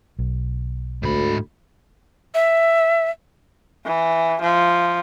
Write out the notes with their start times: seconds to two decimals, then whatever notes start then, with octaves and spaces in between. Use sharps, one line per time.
0.19 B1
1.03 D2 G#2 B5
2.34 E5
3.85 E3
4.41 F3